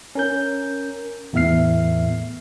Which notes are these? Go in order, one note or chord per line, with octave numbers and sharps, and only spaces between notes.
C#4 A#4 G6
E2 A2 B3 E5 F6 C7